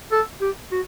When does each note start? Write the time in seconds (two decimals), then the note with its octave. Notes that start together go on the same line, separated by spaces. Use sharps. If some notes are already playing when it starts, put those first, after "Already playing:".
0.12 A4
0.41 G4
0.72 F#4